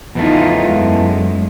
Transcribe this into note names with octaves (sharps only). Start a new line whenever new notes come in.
E2 E3 F3 A3 D#4 F4
F#2 G#3